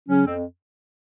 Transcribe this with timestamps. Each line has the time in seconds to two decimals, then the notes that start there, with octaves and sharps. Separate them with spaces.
0.09 C#3 F#3 C#4
0.26 F2 C4